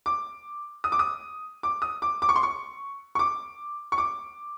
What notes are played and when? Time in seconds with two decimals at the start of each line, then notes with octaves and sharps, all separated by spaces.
0.06 D6
0.84 D#6
0.92 D6
0.99 D#6
1.63 D6
1.82 D#6
2.02 D6
2.22 D6
2.29 C#6
2.36 C6
2.43 C#6
3.15 C#6
3.19 D6
3.92 C#6
3.98 D6